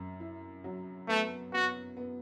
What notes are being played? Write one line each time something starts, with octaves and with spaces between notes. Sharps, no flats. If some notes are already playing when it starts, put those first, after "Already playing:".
Already playing: F#2
E4
F#3
A3 B3
B3 F#4
B3